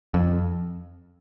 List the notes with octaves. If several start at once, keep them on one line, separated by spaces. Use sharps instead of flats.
F2